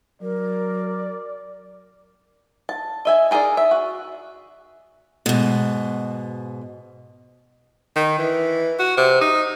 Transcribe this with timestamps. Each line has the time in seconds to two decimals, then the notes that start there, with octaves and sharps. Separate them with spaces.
0.22 F#3 A#4 D5
2.69 A5
3.05 D#5 E5 G#5
3.31 D#4 G#4 A#4 B4 D5
3.57 E5
3.71 F#4
5.26 G#2 B2
7.96 D#3
8.18 E3
8.79 F#4
8.97 C3
9.21 D#4